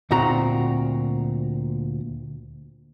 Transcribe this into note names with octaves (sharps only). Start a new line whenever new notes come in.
D2 A#2 C4 F#4 A#5